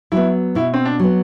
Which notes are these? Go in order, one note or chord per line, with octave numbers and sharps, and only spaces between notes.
F#3 B3 E4
B2 E4
C4
D4
F#3 B3